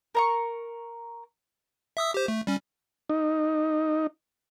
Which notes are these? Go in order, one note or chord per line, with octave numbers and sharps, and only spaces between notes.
A#4 A#5 C#6
E5 D#6 E6
G4 C5
A3
G3 C#4
D#4